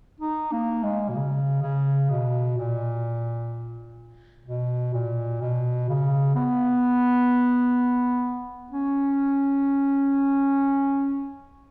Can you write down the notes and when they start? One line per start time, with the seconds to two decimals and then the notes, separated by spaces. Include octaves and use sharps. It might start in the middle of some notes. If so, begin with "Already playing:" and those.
0.20 D#4
0.52 A#3
0.84 G#3
1.09 B2
1.15 C#3
1.62 C#3
2.10 B2
2.57 A#2
4.46 B2
4.93 A#2
5.41 B2
5.89 C#3
6.35 B3
8.72 C#4